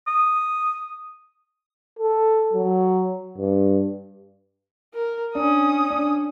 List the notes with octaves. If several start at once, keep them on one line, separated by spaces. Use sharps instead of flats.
D#6
A4
F#3
G2
A#4
C#4 D4 D#6
D4